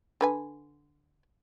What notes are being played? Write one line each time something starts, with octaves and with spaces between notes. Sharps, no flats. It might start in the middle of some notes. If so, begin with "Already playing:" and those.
D3 B4 G#5